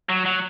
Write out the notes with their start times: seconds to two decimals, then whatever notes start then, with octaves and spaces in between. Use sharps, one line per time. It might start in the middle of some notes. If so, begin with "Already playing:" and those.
0.09 F#3
0.26 F#3